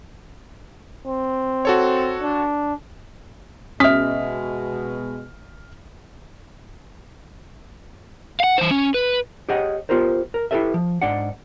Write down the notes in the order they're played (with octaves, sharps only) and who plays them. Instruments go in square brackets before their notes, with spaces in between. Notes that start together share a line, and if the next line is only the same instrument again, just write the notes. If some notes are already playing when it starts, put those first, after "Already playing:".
[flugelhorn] C4
[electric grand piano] F#4 A4 C#5
[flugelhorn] D4
[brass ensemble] B2 G#3 [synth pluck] C#4 [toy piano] E5 D#6 [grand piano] F6 B6
[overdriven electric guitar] F5 F#5
E3 C5
C#4
B4
[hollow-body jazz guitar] G4 G#4 C#5 D#5 F#5
B3 F4 G4 A#4 C5
A#4
E4 F4 G4 A4 B4 E5
F3
G#2 D4 D5 F#5